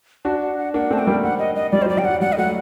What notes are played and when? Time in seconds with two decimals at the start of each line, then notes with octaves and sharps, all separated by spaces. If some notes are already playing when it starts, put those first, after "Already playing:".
0.25 D4 F#4 A5
0.42 F#5
0.58 F#5
0.74 A#3 D4 F#5
0.90 A3 C4 A5
0.99 G5
1.07 G3 A#3
1.23 F#5
1.39 D#5
1.55 D#5
1.72 G3 D5
1.82 C5
1.85 F#3 D5
1.97 G3 G5
2.05 F#3 F#5
2.21 G3 F#5
2.33 D#5
2.37 F#3 A3 F#5